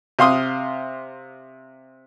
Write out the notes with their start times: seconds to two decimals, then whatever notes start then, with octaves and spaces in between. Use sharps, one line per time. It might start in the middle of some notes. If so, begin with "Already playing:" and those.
0.19 C3 F5 C6 D#6